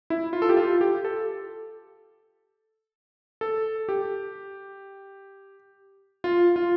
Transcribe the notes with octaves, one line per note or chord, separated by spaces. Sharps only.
E4
F4
A4
G4
F4
G4
A4
A4
G4
F4
F4